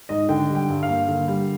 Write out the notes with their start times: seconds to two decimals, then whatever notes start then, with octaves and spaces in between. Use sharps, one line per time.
0.09 G#2 D#5
0.29 D3 G5
0.49 G3
0.55 G5
0.69 G2
0.83 F5
0.88 A#3
1.08 D3
1.28 G3